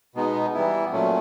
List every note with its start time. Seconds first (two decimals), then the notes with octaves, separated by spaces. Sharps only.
0.15 B2 G#3 B3 D#4
0.54 E3 G3 B3 E4
0.92 A#2 F#3 A3 C#4